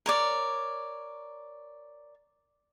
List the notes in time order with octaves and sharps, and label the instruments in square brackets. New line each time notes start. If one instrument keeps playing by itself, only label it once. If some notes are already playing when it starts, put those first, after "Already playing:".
[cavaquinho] A#4 C#5 D5